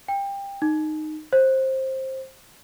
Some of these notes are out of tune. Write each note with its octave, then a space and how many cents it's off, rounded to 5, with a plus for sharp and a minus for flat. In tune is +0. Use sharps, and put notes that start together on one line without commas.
G5 +25
D#4 -10
C5 +15